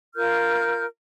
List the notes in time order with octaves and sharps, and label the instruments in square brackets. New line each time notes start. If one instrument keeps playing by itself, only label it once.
[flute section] F4 A#4 F6 G6